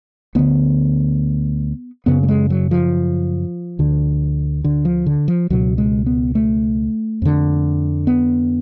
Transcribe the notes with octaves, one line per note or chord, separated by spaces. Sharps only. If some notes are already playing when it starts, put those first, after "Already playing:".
D2 D3 B3
F#2 C#3 B3
A3
G#3
F#3
F3
D2 D3
D3
F3
D3
F3
C#2 B2 F#3
G#3
B3
A3
F2 D3
B3